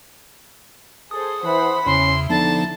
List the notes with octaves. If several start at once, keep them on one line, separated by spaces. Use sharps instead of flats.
G#4 A4 C5 D#6
E3 C5 F#5 B5
E2 C#3 C#4 E4 C6
D3 F3 B3 D#4 A5